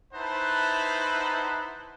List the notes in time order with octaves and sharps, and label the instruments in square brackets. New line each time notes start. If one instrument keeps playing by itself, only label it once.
[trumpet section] D#4 E4 B4 C5 F#5 A5